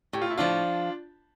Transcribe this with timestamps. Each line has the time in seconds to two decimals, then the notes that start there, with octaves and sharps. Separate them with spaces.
0.13 A2 G4
0.22 F4
0.30 E4
0.38 F3 D4 F4